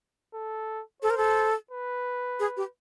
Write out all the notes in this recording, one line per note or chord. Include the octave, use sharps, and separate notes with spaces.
A4
A4 C5
A#4
A4
B4
G#4
G4